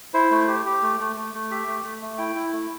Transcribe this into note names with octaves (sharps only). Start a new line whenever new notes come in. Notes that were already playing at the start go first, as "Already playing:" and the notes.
E4 C5
A3
G4
G4
A3
A3
A3
A3
G4 E5
A3
A3
A3
E4 G5
E4
A3